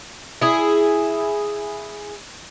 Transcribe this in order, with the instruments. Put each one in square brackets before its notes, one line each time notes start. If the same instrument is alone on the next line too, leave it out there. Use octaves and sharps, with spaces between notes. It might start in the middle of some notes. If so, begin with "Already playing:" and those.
[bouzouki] E4 G#4